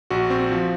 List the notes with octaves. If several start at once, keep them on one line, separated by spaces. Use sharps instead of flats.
A#1 F#4
C4
F3